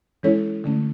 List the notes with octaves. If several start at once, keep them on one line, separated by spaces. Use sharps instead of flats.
E3 G#3 C#4 E4 A4 C#5
D3 A3 C#4